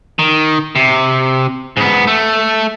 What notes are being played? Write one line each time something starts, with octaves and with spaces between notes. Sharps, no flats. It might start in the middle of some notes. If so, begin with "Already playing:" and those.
D#3
C3
G#2 B3
A3